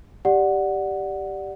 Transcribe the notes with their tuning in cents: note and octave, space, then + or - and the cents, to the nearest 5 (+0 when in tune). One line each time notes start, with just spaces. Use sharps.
G4 +0 D5 +0 F#5 +0